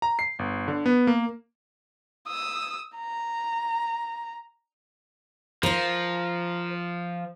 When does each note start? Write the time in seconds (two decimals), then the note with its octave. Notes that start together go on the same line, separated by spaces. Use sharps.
0.02 A#5
0.19 C7
0.39 G1
0.68 D3
0.86 B3
1.07 A#3
2.27 D#6 E6
2.97 A#5
5.63 F3 A#4 C5